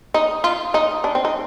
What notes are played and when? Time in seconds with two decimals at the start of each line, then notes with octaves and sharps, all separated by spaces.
0.14 D#4
0.44 F4
0.74 D#4
1.04 D4
1.15 C4
1.25 D#4